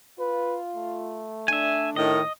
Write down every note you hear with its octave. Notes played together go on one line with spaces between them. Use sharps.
F4 B4
A3
D4 E5 G#5
A2 D#3 D#5